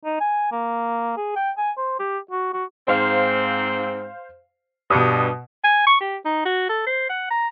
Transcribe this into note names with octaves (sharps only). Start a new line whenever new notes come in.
D#4
G#5
A#3
G#4
G5
G#5
C5
G4
F#4
F#4
G#2 C4 C5 F5
G2 B2 D#6
G#5
C#6
G4
D#4
F#4
A4
C5
F#5
A#5